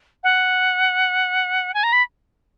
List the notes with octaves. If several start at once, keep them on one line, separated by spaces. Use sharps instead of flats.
F#5
G#5
A#5
B5